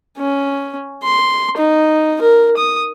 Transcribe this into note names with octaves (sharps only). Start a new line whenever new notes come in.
C#4
C6
D#4
A#4
D#6